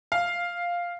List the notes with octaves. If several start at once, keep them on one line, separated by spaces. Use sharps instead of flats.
F5